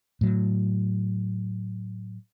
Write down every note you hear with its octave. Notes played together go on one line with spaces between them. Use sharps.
A2 F#3